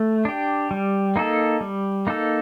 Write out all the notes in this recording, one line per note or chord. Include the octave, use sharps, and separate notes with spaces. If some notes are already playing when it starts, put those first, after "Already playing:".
Already playing: A3
D4 G4
G3
A#3 D#4 A4
G3
A#3 D#4 A4